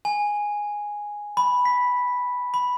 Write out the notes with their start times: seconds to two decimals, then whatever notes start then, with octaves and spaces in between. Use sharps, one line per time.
0.05 G#5
1.37 B5
1.65 B6
2.54 B5